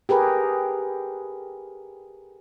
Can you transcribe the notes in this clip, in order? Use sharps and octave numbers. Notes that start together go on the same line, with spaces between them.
G4 G#4 A#4 B4